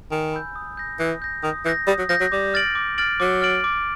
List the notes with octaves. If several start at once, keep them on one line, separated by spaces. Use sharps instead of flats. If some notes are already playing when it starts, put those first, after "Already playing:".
D#3 G#5
B5 E6 G6
D#6
G6 A#6
E3 D#6
G6 A#6
D#3 D#6
E3 G6 A#6
G3 D#6
F#3
F3 G6 A#6
F#3
G3 D6
F6 A6 D7 F#7
D6
F6 A6 D7 F#7
F#3 D6
F6 A6 D7 F#7
D6